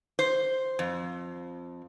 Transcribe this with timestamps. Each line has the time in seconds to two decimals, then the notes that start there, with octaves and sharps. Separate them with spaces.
0.19 C5
0.79 F2